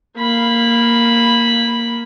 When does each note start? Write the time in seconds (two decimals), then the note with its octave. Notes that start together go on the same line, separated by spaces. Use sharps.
0.18 A#3 B5